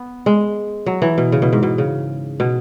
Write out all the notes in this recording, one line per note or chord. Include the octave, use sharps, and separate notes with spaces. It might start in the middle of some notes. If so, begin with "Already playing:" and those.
Already playing: B3
G#3
F#3
E3
B2
C#3
B2
G#2
B2
C#3
B2